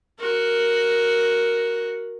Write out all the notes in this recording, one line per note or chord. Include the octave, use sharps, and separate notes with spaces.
F#4 A#4